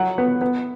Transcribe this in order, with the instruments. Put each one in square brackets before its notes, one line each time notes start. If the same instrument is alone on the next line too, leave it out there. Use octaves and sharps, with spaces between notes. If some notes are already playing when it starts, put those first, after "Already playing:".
Already playing: [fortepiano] F#3 F#5
B3
B3